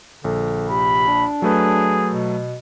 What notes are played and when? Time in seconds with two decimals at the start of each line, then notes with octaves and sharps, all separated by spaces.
0.24 A#1 D3
0.70 C3 B5
1.08 D4
1.42 F#3 A3 G#4 B4
2.11 B2